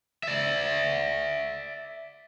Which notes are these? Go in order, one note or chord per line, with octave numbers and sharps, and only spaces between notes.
D5 E5